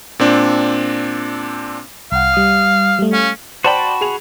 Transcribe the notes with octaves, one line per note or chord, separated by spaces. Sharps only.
A#2 C4 D4
C2 F5 F#5
G3 D#6
G3 A3
C#4 F5
F#4 C5 D5 G5 A5 B5
G#4 F7